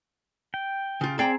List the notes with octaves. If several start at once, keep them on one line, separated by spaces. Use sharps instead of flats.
G5
C#3 F4
C4 G#4 D5 G5 A#5